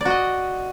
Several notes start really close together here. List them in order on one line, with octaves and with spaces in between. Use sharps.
D5 F#4 D#5